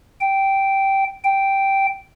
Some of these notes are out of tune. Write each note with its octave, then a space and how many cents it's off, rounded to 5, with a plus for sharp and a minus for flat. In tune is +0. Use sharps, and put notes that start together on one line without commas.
G5 -10
G5 -5